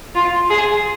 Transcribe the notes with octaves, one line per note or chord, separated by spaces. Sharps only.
F4
G#4